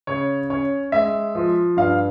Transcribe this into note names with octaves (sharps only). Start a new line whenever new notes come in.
C#3 C#5
C#4 C#5
G#3 E5
F3
G2 F5